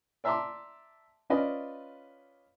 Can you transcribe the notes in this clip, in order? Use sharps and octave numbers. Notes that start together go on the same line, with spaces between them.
D5 E5 A5 A#5 C6 D6
C#4 F4 B4 D5 D#5